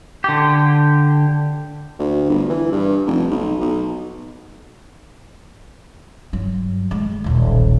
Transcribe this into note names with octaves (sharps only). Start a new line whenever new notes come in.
D3 G4
D2
G1
E3
G2
F1
B1
B1
G2 F#3
G#3 A3
D#1 B1